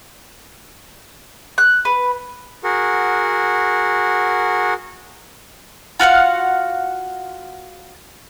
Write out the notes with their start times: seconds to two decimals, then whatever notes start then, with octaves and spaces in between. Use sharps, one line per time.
1.58 F#6
1.85 B4
2.64 F#4 G#4 A#4 F#5
6.00 F4 F#4 F5 F#5